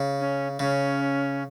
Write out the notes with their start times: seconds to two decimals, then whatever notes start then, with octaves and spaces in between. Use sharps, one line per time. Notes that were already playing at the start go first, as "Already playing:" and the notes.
Already playing: C#3
0.20 C#4
0.59 C#3 C#4